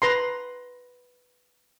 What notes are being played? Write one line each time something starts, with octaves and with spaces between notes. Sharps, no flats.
B4 A#5 C6